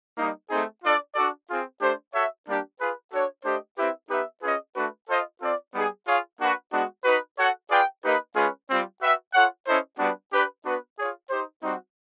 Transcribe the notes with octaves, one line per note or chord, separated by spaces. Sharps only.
G3 A#3 D#4
A3 C4 D#4 G#4
D4 F4 A4 D5
D4 F#4 A4 D5
C4 F4 G#4
A3 D4 G4 C5
F#4 A4 C#5 E5
G3 A#3 D4 G4
F4 G#4 B4
D4 F#4 A4 C#5
A3 D4 G4 C5 D#5
C4 E4 G4 B4 E5
B3 D#4 G4 B4 E5
C#4 F4 G#4 B4 D#5
A3 D4 F#4 B4
F4 A4 C5 D#5
C4 F4 A4 D5
G3 B3 D#4 G#4
F4 G#4 C#5 F5
A#3 D4 F#4 B4
G#3 B3 D4 F#4
D#4 F#4 B4
F#4 A4 C#5 F#5
F4 G#4 B4 D5 G5
A#3 D#4 G4 B4 D#5
G#3 C#4 F4 G#4 B4
G3 C4 F4
F#4 B4 E5 G5
F4 A4 C#5 F#5
C#4 E4 A4 C5 D#5
G3 B3 D4 F#4 B4
D4 G4 B4 D5
B3 D4 F#4 B4
F4 G#4 C#5
D#4 G4 C5
G3 C4 D#4 F#4